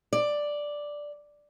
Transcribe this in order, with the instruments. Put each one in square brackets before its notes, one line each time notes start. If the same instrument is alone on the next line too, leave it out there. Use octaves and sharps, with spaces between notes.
[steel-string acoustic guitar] D5